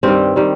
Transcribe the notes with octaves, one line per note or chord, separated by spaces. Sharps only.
G2 D#3 G3 C4
D#3 G3